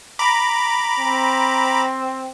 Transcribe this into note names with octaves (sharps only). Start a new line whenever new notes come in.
A#5 B5 D6
C4